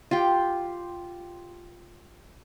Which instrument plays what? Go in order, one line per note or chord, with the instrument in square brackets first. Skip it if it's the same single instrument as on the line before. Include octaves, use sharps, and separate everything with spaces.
[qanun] F4 G4 G5